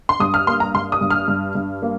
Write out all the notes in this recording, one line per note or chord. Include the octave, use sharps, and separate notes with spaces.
C6
G2 D#6
F6
A#3 C6
A#5
G2 C6
D#6
G2
F6
G2
G2
A#3